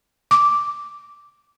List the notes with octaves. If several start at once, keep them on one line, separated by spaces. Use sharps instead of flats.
D6